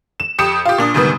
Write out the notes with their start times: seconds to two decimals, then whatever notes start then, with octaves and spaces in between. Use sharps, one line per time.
0.20 E7
0.39 F2 G4 D#6 C#7 E7
0.65 F4 G4
0.78 A#2 D4 D#6
0.94 D2 G#2 C3 D#3 G3 B3